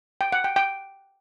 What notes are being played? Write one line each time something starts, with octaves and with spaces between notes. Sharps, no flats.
G5
F#5
G5
G5